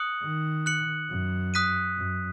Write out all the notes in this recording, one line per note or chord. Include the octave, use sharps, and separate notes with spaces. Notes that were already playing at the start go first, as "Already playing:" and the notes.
Already playing: D#6 F#6 C#7 F#7
D#3
F#6 C#7 F#7
F#2
D#6 F#6 B6 D#7
F#2